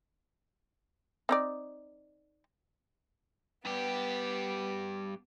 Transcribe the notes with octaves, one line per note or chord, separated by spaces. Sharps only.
C4 D#4 D5
G2 B3 G4